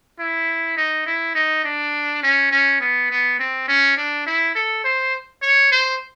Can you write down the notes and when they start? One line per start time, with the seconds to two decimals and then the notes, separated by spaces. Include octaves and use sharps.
0.19 E4
0.77 D#4
1.06 E4
1.35 D#4
1.65 D4
2.23 C#4
2.51 C#4
2.80 B3
3.10 B3
3.39 C4
3.68 C#4
3.97 D4
4.26 E4
4.55 A4
4.84 C5
5.42 C#5
5.72 C5